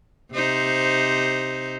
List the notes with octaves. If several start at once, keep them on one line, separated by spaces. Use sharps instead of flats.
C3 D#4 C5